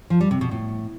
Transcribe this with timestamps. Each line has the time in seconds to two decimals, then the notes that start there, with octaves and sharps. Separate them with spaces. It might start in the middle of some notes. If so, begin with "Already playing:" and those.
0.10 F3
0.21 G3
0.31 C3
0.41 B2
0.51 A2